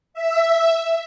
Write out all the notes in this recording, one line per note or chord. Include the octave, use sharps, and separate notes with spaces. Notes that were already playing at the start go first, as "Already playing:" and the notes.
E5